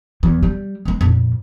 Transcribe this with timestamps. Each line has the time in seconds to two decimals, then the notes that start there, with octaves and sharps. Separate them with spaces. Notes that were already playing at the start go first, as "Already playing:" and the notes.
0.23 E2 E3
0.43 G3
0.85 G#3 C4
1.01 F2 A#2